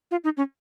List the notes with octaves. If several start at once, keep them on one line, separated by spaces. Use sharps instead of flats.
F4
D#4
C#4